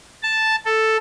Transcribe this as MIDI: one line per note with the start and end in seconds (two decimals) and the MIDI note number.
0.23 0.55 81
0.66 0.97 69